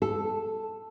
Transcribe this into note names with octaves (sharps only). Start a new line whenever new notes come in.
A4